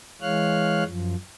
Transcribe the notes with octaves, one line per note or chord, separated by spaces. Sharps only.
E3 G#3 C#5 F5 F6 F#6
F#2 F3